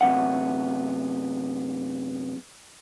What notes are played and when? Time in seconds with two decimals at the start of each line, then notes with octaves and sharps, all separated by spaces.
0.01 F#2 C3 B3 F#5